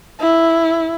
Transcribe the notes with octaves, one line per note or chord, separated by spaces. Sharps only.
E4